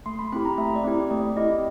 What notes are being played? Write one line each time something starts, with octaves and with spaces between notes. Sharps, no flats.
A3 C6
B5
C4 E4 G4 B5
A#5
A3 E5
D5
C4 E4 G4
A3 D5
C4 E4 G4 D#5